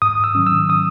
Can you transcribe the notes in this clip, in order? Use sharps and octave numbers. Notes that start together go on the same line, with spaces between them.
G#2 D#6
E6
D#3 F#3 C#4
E6
D#6